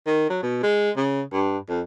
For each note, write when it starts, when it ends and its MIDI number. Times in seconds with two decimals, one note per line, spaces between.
0.06 0.28 51
0.30 0.39 54
0.43 0.63 47
0.63 0.91 56
0.96 1.22 49
1.33 1.57 43
1.69 1.82 41